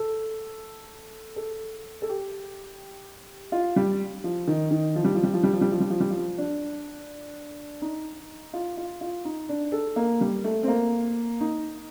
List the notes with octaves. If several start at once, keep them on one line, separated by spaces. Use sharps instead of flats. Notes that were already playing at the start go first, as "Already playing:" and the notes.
Already playing: A4
A4
A4
G4
F4
G3
F3
D#3
D#3
F3
G3
F3
G3
F3
G3
F3
G3
F3
G3
F3
G3
F3
D4
D#4
F4
F4
F4
D#4
D4
A4
A#3
G3
A3
C4
A#3
D#4